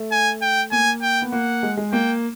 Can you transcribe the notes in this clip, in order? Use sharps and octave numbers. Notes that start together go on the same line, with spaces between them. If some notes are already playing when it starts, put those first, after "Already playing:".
Already playing: A3
G#5
G5
A#3 G#5
G5
B3
A#3 F#5
G#3
G#3
A#3 G5